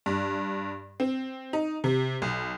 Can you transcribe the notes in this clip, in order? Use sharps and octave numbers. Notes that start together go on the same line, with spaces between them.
G2
C4
D#4
C3
B1